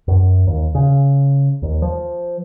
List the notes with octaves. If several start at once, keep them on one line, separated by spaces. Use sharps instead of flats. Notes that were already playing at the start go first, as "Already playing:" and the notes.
F#2
D#2
C#3
D#2
F3